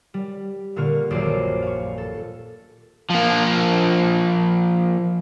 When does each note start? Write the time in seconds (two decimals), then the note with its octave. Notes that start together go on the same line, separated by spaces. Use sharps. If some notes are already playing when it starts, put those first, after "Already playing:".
0.14 G3
0.76 A#2 D3 A#3 C#6 F6
1.10 D#1 A#1 F#2 C5 D5 C7
1.62 F5 C#6
1.98 A4
3.10 F3 A#3